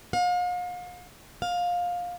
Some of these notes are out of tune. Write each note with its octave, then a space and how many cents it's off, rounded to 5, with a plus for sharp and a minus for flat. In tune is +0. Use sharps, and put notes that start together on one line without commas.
F5 +40
F5 +20